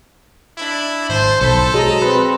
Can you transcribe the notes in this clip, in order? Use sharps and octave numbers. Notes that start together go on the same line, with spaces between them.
D4 E4 D5
G#1 C5 A5 C6
B1 A4 C5 B5
F#3 G#3 D#5 A#5
C4 B4